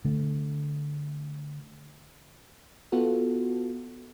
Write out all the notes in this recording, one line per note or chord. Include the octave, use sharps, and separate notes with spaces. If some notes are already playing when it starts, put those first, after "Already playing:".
D3 A3
B3 F4 F#4 A4